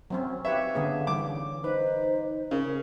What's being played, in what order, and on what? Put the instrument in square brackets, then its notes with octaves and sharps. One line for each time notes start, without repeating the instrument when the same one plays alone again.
[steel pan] F#3 C4 C#4
[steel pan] G4 B4 C#5 [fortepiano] E5 [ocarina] F5
[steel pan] D3 B3 G#4 [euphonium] C#4
[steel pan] E3 G3 [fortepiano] D6
[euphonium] D#4 [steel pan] B4 [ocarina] C5
[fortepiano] C#3 [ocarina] A#4